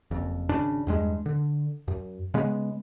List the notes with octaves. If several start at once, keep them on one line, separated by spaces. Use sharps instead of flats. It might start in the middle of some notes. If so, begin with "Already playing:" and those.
F#1 F2
G#1 C#3 D4
E2 G2 G#3
D3
F#2
C#3 G#3 B3